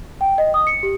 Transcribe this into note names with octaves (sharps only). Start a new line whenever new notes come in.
G5
D#5
D#6
C#7
G4